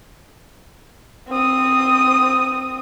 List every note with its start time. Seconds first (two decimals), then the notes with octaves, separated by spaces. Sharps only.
1.29 C4 D#6